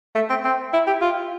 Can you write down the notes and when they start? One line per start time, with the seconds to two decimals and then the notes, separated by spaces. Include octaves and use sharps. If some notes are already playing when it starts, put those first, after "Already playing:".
0.15 A3
0.30 C4
0.45 C4
0.73 E4
0.87 G4
1.01 F4